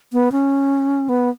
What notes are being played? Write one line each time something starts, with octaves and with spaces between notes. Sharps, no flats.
B3
C#4
B3